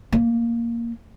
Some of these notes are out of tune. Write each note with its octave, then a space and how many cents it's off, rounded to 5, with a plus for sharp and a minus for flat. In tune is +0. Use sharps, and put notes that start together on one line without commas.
A#3 +0